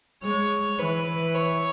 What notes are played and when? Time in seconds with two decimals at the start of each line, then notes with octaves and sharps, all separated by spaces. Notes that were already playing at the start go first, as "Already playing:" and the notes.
0.23 G#3 C#5
0.78 E3 B4
1.34 C#5